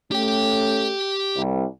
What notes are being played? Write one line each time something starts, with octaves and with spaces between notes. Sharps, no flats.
A3 C#4 G4 G5
C2